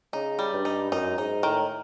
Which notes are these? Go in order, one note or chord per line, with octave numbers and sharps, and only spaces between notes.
C#3 D#4
G3
G2
D#4
F#2 D#4
G#2 D#4
A2 D#3